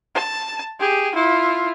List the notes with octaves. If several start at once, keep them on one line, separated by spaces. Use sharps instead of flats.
A5
G4 G#4
E4 F4